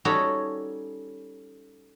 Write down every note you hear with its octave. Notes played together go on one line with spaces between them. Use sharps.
G3 C#4 D#4 F#4 A4 C#5